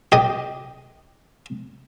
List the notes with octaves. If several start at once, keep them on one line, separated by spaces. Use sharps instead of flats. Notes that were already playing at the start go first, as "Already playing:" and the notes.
G4 D#5